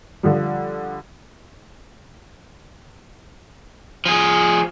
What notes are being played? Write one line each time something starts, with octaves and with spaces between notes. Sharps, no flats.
D3 F3 G3
F3 G#4